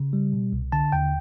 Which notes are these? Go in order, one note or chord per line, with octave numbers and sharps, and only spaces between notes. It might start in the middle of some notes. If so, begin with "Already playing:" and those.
Already playing: C#3
G3
B2
C2
D3 A5
D#2 G5